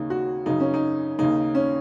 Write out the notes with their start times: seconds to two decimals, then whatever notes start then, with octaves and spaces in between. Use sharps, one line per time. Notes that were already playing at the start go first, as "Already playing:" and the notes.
Already playing: D#2 C#3 D#4
0.10 F#4
0.46 F#2 C#3 D#4
0.60 C#4
0.74 D#4
1.19 D#2 C#3 D#4
1.55 C#4